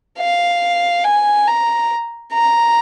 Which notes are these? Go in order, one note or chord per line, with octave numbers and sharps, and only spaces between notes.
F5
G#5
A#5
A#5